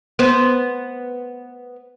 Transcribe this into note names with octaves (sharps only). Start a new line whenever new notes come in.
B3 C5